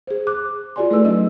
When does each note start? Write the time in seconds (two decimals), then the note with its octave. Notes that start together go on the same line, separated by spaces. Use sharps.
0.07 G#4 C5
0.27 D6 F#6
0.76 F4 F#4 G#4 D5 G#5 C6
0.91 A3 E4 A4 B4 D5 E6
1.05 F#3 C#4 D#4 D#5 E6